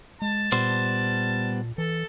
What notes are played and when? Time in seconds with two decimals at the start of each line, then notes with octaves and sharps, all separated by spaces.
0.22 G#3 A5
0.52 A#2 G3 B3 C5
1.78 E3 A4